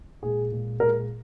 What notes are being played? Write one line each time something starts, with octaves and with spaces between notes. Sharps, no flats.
A#2 G#3 G#4
A#2 G#3
A#2 G#3 A#4